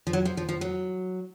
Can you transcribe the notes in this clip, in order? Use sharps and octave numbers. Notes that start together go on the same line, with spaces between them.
F3
F#3
F3
F3
F3
F#3